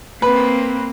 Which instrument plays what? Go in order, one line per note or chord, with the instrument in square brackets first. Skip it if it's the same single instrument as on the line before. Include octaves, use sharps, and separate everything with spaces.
[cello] A#3 C4 [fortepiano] B4